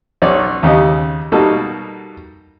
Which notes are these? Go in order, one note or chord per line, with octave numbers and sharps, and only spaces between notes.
B1 C#4 D5
D#2 C#3 G4 D#5
B2 G3 A#3 D#4 F#4 A4